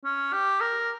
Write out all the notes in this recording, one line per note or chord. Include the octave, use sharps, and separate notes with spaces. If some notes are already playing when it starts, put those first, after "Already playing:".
C#4
G4
A#4